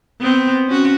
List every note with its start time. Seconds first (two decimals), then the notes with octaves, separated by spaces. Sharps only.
0.21 B3 C4
0.67 C#4 F#4